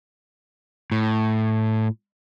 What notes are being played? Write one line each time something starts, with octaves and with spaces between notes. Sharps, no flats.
A2